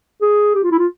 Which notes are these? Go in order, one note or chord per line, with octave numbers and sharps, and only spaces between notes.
G#4
G4
F4
E4
F4